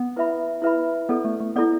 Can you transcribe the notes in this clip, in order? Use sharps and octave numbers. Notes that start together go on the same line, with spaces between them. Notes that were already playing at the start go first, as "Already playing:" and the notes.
Already playing: B3
E4 B4 E5 B5
E4 B4 E5 B5
B3 E4 A4 D5
A3
A3
B3 E4 A4 D5